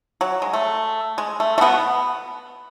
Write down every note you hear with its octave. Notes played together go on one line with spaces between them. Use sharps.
F#3
G#3
A3
G#3
A3
A3
B2 B3